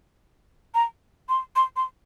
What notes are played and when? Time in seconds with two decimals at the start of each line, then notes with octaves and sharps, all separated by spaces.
0.75 A#5
1.29 C6
1.56 C6
1.76 C6